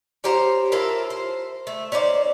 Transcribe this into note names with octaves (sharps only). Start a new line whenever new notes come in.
C#4 G4 C5 A#5
E4 F4 A4 A#4
C5
A3
C#4 D#4 C5 D5